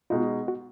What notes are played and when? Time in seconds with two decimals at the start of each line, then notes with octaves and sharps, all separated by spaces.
0.10 B2 G#3 D#4 F4
0.48 F#4